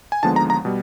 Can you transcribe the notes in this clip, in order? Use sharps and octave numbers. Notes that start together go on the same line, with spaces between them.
G#5
D#2 D3 F3 G#3 B3 A5
A#5
A#5
B2 G3